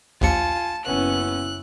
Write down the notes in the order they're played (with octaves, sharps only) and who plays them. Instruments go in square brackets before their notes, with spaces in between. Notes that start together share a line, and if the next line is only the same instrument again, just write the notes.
[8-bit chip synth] A#1 D#2 C#7 [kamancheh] F4 G#5 [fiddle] A5
[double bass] F#1 E4 [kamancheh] B3 C#4 [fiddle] F#6